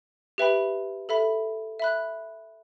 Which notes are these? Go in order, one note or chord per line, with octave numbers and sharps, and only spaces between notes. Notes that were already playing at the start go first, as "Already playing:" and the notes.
G4 B4 E5 G5 B5
A4 E5 B5
E5 B5 F#6